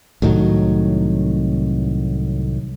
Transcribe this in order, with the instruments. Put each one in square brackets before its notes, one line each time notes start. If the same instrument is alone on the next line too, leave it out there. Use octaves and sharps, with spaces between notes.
[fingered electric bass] C2 A2 D#3 F#3